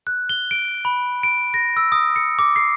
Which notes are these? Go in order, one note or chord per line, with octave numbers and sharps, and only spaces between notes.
F#6
G7
D7
B5
D7
A#6
E6
D#6
C#7
D6
C7